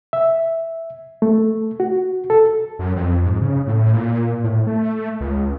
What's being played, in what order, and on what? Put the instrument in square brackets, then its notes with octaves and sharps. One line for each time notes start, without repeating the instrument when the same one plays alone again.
[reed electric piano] E5
A3
F#4
A4
[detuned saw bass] F#2
F2
G#2
C#3
A2
A#2
A2
A3
C#2